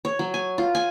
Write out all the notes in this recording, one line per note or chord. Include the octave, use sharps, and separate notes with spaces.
C#5
F#3
G#5
F4
G#5